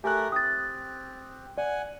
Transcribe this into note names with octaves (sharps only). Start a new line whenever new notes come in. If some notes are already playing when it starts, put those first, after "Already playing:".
A3 G4 A#4 G#5 F#6
C4 D#6 A6
D5 F#5 G#5